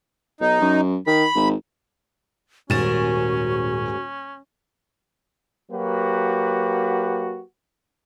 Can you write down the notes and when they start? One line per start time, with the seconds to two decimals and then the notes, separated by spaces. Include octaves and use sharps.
0.41 B1 D#4
0.61 F#2
1.07 D#3 B5
1.35 G#1
2.70 D#1 G#2 C#4 F#4 G#4 A#4 A6 E7
5.72 F#3 A#3 F#4 G4 B4